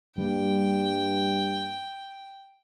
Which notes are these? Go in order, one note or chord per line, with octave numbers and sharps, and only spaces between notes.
G2 G3 A#3 G5